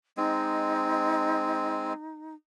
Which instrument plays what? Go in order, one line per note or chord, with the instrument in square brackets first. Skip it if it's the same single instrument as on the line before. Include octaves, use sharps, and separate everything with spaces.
[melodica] G#3 C4 [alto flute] D#4